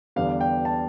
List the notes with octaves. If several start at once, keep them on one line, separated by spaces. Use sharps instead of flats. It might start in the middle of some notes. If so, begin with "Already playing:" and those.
E2 D3 G3 B3 F5
G5
A5